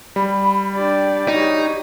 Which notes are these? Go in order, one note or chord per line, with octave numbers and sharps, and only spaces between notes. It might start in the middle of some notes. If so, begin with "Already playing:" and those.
G3 B5
D4 G4 D5
D#4 F#4 C#5